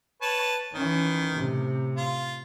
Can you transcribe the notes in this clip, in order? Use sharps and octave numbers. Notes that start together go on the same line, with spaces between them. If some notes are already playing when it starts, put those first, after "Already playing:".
B4 C#5 A5
D#3 E3 C#4
A2 C3
F4